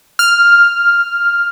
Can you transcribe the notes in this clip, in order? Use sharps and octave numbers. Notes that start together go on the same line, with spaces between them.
F6